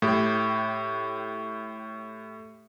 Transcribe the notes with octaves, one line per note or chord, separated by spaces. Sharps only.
A2 G4